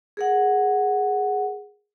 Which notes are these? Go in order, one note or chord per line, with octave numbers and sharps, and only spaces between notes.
G#4 A#4 F#5